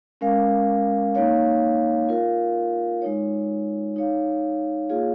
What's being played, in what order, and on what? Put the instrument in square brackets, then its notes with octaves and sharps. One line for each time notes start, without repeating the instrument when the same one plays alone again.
[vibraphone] G#3 C#4 A#4 F5
A#3 D#4 C#5 F5
F4 A#4 F5
G#3 D#4 C#5
D#4 C#5 F5
A#3 F4 G#4 C#5 F5